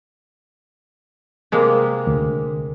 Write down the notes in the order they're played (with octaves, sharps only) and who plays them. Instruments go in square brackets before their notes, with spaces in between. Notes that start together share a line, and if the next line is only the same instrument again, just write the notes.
[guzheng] C3 G#3 A#3
[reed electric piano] D2